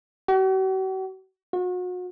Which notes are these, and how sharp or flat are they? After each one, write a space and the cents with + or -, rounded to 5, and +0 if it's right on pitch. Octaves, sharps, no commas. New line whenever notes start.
F#4 +45
F#4 -35